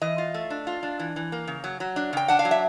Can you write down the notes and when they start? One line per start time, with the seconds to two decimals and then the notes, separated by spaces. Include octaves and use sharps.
0.01 E3 D#5
0.18 F4
0.34 A3
0.50 D4
0.67 F4
0.83 D4
0.99 E3
1.16 E3
1.32 A#3
1.47 C#3
1.64 F#3
1.80 F#3
1.96 D4
2.13 C#3 G5
2.28 D4 F#5
2.39 F5
2.45 F#3
2.51 E5